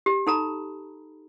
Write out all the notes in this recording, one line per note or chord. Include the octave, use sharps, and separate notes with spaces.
G4
D#4 A4 A#5 B5